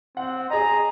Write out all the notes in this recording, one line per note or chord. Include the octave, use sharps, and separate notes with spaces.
C4 F#5
G#4 D#5 A#5